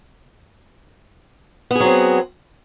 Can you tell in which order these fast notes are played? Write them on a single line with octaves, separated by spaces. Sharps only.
B3 G#4 F#3 C4